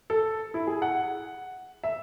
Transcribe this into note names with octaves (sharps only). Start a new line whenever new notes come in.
A4
E4
G#4
F#5
E5